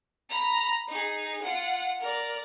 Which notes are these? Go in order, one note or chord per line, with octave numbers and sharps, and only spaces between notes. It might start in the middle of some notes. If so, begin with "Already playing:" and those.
A#5 B5
D#4 G#4
F4 F#5
A#4 D5